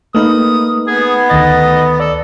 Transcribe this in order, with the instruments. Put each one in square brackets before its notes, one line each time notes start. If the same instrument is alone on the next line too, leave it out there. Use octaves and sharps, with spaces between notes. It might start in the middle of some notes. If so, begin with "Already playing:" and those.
[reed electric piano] A3 D#4 [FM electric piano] A#3 B4 [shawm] D#6
[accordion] B3 [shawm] G#4
[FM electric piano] D2 D#3 A6 [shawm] D#5
[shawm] A4 [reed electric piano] D5